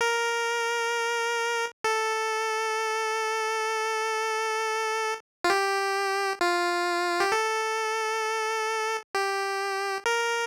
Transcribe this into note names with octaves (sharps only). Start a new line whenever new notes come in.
A#4
A4
F4
G4
F4
G4
A4
G4
A#4